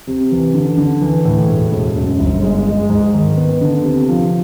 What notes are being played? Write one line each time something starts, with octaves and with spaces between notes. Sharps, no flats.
C3
E3
D3
D3
E3
A2
E1
E1
F#2
G1
G#3
G#3
G#2
D#3
B3
D3
C3
F3